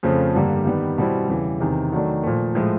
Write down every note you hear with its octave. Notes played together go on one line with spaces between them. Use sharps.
F2 C#3 F3 A3 C4
G2 D3 G3 A#3
D#3 G3 B3
B2 G3 C4 E4
E2 C#3 E3 G3
E2 C3 D#3
D#3 F#3 A3 D4
A#2 F3 A3
A2 F3 G#3